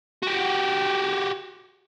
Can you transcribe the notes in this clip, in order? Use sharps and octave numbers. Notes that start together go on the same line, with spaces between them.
F#4 G4